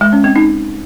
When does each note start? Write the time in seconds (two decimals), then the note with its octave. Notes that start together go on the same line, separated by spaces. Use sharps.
0.01 G#3
0.13 C#4
0.24 C4
0.36 D#4